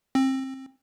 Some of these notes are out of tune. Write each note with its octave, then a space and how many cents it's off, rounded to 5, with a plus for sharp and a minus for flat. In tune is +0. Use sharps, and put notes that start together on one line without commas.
C4 +25